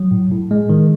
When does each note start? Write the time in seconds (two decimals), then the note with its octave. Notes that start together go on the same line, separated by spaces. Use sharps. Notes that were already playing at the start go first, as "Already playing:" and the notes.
Already playing: F#3
0.11 A2
0.31 A2
0.51 G#3
0.70 D#3